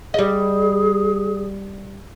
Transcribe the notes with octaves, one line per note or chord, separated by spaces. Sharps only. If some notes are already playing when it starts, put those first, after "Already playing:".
G3 G#4 D#5